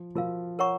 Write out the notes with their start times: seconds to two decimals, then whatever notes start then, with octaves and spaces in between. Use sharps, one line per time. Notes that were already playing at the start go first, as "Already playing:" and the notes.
Already playing: F3
0.15 F3 F#4 A#4 F5
0.59 A#4 C#5 F#5 A#5 C#6